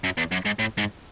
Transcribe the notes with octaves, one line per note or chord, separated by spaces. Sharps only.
F#2
E2
F#2
G#2
A2
G#2